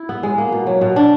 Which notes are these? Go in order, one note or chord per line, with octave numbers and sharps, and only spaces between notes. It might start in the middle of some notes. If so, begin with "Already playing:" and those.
Already playing: E4
B3
G#3
A#3
B2
F#3
B2
D4